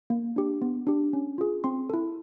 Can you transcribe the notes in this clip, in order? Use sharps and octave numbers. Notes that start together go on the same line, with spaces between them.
A#3
D4 G4
B3
D4 G4
C#4
F4 G#4
C4 C6
E4 A4